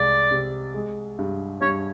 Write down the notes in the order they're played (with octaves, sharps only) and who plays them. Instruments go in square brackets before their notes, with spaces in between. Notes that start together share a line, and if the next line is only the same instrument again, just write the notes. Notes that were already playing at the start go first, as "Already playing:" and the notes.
Already playing: [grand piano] C2 G#3 [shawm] D5
[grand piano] C3
G#3
G2
[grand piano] G2 [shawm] C#5